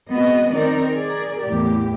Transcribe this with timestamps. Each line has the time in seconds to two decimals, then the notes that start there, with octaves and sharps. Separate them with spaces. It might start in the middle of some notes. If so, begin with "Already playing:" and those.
0.11 G#3 B3 C4 F#4 D#5
0.53 D#3 C4 D#4 A#4 D5
0.94 G#4 A#4 D5
1.45 E2 A2 G4